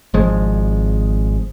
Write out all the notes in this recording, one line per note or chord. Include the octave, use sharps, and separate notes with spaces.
G#1 F3 G#3